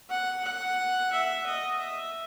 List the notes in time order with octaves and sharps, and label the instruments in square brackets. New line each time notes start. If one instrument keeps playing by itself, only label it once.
[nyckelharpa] F#5
F#5
E5
D#5
E5